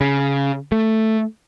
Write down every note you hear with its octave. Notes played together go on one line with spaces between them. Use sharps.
C#3
A3